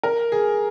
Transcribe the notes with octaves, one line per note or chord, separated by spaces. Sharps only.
A#4
G#4